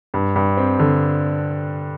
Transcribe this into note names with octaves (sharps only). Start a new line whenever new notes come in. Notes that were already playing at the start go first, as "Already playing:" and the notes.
G2
G2
C4
D3